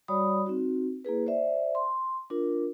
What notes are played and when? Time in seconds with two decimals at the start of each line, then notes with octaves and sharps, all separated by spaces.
0.08 G3 F#4 C#5 D5 B5 D#6
0.46 C4 D#4 F#4
1.05 A#3 E4 G#4 B4
1.26 C5 D5 E5
1.75 C6
2.30 D4 F4 A#4